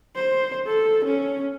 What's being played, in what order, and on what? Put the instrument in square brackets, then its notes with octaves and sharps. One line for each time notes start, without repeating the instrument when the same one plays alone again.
[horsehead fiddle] C5
A4
C#4